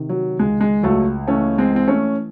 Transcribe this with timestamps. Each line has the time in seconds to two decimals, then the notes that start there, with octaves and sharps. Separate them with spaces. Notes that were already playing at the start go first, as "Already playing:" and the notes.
Already playing: C3 D#3
0.09 F#3
0.39 C#2 G#3
0.61 G#3
0.83 C#2 F#3 A3
1.28 E3 A3 C#4
1.58 G#3 C4
1.72 E3 C4
1.88 A3 C#4